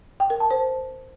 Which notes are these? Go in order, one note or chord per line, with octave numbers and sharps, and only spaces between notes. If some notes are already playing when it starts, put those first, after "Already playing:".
G5
A#4
A5
C5